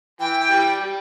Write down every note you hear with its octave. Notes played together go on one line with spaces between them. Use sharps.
E3 G5
E3 G3
G3